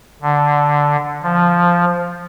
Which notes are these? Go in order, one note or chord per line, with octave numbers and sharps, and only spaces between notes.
D3
F3